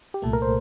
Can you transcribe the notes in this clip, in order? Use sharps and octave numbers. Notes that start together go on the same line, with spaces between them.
G4
C2 A#2 A3 A4
A#4
C5